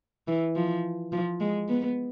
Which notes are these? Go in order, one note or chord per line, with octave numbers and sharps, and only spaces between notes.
E3
F3
F3
G#3
B3